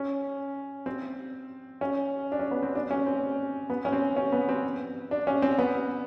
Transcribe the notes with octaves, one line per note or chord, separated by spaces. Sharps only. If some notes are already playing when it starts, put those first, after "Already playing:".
Already playing: C#4
C4
C#4
D4
C#4
B3
C4
D4
C#4
C4
B3
C#4
C4
C#4
B3
C4
D4
C#4
C4
B3